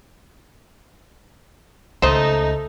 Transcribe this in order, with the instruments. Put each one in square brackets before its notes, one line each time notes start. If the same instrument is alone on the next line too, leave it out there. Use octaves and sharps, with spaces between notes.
[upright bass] C#2 [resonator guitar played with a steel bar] A3 [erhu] D#4 [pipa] C5 D#5